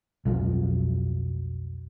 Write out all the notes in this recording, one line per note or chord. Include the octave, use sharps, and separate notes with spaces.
B1 F2 F3 F#3